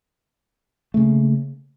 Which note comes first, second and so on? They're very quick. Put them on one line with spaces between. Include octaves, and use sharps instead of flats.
A3 C#3 A#3